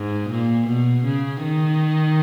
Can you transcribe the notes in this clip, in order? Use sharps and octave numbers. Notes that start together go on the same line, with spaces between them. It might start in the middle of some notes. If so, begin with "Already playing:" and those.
Already playing: G#2
A#2
B2
C#3
D#3